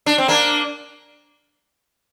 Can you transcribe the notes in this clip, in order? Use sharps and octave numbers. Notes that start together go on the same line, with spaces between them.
D4
C4
A#3 D4